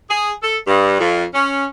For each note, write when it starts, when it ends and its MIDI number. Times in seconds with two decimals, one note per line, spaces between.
0.10 0.33 68
0.42 0.58 69
0.67 0.99 43
1.00 1.24 41
1.34 1.65 61